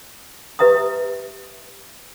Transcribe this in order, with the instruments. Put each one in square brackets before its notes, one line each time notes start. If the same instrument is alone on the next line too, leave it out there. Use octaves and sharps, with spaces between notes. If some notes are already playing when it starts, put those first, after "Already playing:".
[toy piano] G4 B4 E5 A#5 D#6